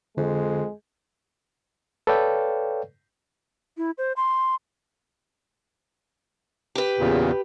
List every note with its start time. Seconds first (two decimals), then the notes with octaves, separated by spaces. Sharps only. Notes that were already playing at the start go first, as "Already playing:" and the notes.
0.17 F2 D3 G#3
2.07 A4 B4 C#5 D5 F5 G5
3.77 E4
3.98 C5
4.16 C6
6.75 G4 B4
6.99 E2 A#2 C#3